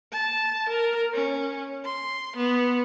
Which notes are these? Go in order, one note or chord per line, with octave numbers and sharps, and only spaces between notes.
A5
A#4
C#4
C6
B3